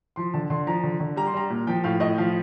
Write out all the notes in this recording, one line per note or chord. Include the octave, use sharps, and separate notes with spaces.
F3 C6
D3 A5
D3 C6
F3 A#5
D3
D3
G3 A#5
C6
G3 A#5
A#2
F3 G5
A2 F5
A2 D#5
F3 F5